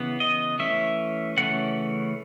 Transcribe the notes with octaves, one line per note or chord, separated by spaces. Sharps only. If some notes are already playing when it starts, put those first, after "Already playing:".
Already playing: C#3 E3 B3
D#5
E3 A3 C#4 E5
C#3 E3 A3 C#4 F#5